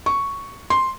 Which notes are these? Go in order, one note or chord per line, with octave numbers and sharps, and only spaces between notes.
C#6
C6